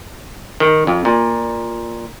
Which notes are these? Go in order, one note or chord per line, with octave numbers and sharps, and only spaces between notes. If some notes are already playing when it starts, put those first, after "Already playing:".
D#3
F2
A#2